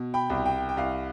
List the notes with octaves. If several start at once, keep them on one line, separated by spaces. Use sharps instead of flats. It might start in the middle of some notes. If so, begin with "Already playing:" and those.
Already playing: B2
G5 B5
C2
G5
G5
C2 F5